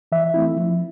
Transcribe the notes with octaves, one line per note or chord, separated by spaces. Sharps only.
E3 E5
A3 C4 E4
F3